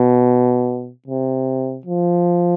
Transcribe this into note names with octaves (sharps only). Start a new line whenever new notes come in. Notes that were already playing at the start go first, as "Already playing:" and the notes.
Already playing: B2
C3
F3